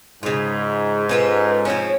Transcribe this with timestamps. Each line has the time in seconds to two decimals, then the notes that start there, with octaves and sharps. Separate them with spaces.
0.23 G#2 C#3 F4
1.09 C#4 F4 A4 B4
1.65 F3 C4 C#4 C#5